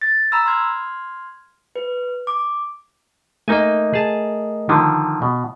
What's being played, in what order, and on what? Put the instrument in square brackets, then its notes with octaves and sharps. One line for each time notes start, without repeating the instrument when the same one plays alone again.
[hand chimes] A6
A#5 B5 E6
C6 F6 G#6
B4
D6
[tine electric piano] A3 A#4 D#5 [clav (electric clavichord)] A#3 D#4 G#5
[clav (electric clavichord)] G#4 A5
D3 D#3 F3
B2